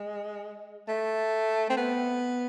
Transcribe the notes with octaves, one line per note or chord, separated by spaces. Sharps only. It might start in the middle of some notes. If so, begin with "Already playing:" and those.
Already playing: G#3
A3
C4
B3